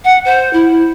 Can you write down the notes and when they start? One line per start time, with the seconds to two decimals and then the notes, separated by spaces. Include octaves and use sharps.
0.04 F#5
0.25 C5
0.53 E4